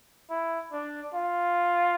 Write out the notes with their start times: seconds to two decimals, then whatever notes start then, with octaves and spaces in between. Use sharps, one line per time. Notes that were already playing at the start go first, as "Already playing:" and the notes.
0.30 E4
0.72 D4
1.15 F4